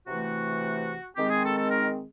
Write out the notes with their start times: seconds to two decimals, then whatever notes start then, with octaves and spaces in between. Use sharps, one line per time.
0.07 C3 E3 A3 F#4
1.15 D#3 G#3 C4 G4
1.29 G#4
1.43 A4
1.57 A4
1.70 A#4